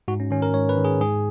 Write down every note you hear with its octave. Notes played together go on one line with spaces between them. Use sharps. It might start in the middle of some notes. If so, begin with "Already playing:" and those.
G#2 F#4
C#4
D#3 C#4
A#4
G#2 C#5
B4
D#3
G#4
G#2 G#4